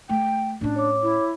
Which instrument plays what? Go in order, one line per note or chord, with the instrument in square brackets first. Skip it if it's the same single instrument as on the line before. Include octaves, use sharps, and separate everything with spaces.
[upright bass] A3 [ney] G5
[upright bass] A2 C#4 [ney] D4
[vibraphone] C#5 D6
[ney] E4